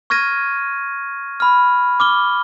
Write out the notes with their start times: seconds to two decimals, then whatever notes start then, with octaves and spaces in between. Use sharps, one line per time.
0.10 C#6 F6 G#6 A#6 D#7
1.40 B5 F6
2.00 D6 F6 G7